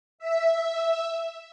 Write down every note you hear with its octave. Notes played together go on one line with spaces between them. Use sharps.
E5